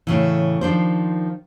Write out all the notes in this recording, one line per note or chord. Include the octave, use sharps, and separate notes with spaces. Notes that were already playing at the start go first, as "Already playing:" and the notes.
A2 C#3 E3
D#3 F3 D4 C5